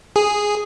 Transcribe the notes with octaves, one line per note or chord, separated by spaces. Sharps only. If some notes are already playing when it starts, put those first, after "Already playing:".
G#4